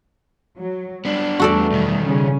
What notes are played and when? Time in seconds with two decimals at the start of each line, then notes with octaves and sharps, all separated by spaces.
0.59 F#3
1.05 G3 B3 D4
1.40 E2 G3 A3 F#4 A4 D5
1.72 B1 D#3
2.04 C#3 G3 C#4